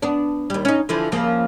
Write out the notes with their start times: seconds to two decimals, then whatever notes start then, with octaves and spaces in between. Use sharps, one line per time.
0.02 B3 D4
0.50 D#2 G3
0.65 C#4 D#4
0.89 D3 E3 F3
1.12 C#3 F3 A#3